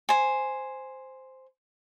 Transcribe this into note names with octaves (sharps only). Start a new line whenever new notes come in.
C5 G#5